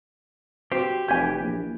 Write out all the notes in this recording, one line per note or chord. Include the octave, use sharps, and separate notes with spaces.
C4 F#4 G4 C7
F1 E3 G#5 G6 G#6 B6
A#1